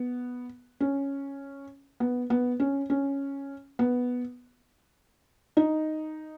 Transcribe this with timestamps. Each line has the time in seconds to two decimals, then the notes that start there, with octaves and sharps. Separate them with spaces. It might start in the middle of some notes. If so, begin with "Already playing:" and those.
Already playing: B3
0.80 C#4
2.00 B3
2.30 B3
2.60 C#4
2.90 C#4
3.79 B3
5.57 D#4